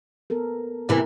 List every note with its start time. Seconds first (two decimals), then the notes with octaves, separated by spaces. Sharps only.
0.30 B3 A4 A#4
0.89 C3 E3 A#3 E4 A#4